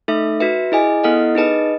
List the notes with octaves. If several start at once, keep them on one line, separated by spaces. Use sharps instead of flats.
A3 D#4 A4 E5
F#4 B4 E5
E4 G#4 D#5 G#5
B3 E4 A4 D#5 F#5
D#4 G#4 B4 D#5 A5